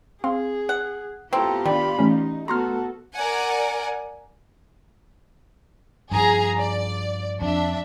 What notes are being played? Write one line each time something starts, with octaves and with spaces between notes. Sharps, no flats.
C4 G#4 F5 C6
F#5
B3 C4 E4 F4 G4 A4 A#5
D#3 G3 D4 B5
E3 A3 C#4 D#4
A3 B3 F#4 A4 A#5 C6 F6
A#4 D5 F#5 G#5
G2 F3 G#4 A#5
D5
F2 D4 E5